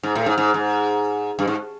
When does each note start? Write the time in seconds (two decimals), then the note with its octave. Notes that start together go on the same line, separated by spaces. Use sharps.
0.03 G#2
0.15 A2
0.26 G#2
0.38 G#2
0.54 G#2
1.39 G2
1.47 G#2